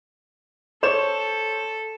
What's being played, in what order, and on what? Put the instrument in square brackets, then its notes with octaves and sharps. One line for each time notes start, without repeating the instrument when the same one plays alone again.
[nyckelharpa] A4 [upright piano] C5 C#5 E7